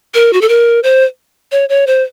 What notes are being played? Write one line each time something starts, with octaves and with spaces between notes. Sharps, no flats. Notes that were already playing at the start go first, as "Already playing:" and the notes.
A#4
F#4
A4
A#4
C5
C#5
C#5
C5